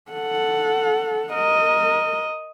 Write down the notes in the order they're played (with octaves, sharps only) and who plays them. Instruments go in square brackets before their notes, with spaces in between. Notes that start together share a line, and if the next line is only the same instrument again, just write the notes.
[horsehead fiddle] A4 F#5
[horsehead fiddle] A#4 [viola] D#5